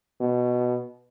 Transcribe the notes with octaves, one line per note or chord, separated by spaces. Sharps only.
B2